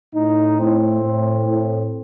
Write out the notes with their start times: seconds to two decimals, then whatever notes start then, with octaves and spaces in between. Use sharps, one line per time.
0.14 A2 D#4
0.59 A2 C4
1.02 A2
1.46 A2